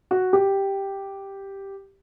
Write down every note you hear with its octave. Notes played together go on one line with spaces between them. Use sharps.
F#4
G4